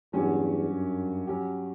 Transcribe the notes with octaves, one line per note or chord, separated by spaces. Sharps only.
E2 G2 F#3 C#4 G4
F#2
F#3 C#4 G4